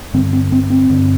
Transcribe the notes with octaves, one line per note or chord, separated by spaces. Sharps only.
G2 D3 C4
C4
C4
C4
G2 D3